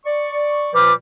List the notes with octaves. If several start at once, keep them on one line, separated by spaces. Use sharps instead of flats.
D5 C#6
A#2 F3 G3 B4 D6 F6